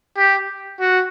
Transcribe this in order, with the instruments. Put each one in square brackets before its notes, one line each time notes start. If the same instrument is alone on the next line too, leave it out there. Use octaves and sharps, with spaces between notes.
[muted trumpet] G4
F#4